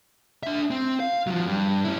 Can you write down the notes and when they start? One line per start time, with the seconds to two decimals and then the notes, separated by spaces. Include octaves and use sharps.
0.43 D4 E5
0.71 C4
1.00 F5
1.27 F3 F#3
1.46 G2
1.84 C#4 E4